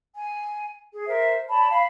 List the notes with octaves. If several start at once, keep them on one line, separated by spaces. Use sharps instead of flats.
G#5
G#4
A#4 C5 E5
C#5 D5 A5 B5
F5 B5